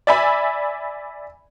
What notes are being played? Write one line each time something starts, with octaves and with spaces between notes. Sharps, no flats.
D5 E5 G#5 B5